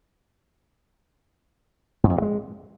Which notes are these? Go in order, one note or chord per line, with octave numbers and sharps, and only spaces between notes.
G#2
F2
G2
G#3